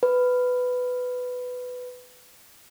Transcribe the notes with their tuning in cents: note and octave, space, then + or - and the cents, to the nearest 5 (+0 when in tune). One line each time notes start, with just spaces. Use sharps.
B4 +10